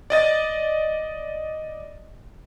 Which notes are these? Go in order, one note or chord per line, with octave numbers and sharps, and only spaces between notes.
D5 D#5 A6